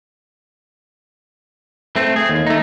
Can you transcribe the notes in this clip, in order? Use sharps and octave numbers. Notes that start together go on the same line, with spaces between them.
A3 C4
G#4
D#2
A3 D#4